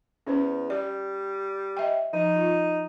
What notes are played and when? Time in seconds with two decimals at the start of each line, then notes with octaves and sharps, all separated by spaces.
0.27 E2 C#4 C5
0.70 G3 D5
1.77 D#5 E5 G5
2.13 F3 D#4
2.36 F4